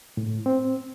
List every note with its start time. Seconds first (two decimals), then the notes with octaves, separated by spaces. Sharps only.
0.17 A2
0.46 C4